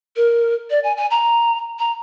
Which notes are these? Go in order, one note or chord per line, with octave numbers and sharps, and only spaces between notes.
A#4
D5
G#5
G#5
A#5
A#5